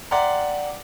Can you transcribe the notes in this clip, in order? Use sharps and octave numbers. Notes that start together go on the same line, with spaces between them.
D5 E5 F#5 G5 A#5 C6